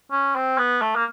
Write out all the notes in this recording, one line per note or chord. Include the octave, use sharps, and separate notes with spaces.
C#4
C4
B3
A3
A#3